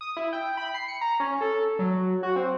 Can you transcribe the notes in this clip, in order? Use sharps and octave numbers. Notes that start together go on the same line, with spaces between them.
D#6
E4
G5
B5
C7
C#7
A#5
C#4
A4
F#3
F#4
C4